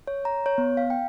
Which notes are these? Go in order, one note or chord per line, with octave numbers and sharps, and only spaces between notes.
C#5
A#5
C#5
B3
F5
G5